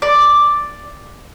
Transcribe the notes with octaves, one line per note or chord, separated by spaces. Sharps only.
D5